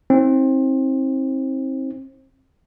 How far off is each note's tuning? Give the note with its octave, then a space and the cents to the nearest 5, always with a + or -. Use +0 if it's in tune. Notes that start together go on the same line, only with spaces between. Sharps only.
C4 +25 D#4 +45